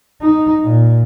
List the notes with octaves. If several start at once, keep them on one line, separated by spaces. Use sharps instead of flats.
D#4
A#2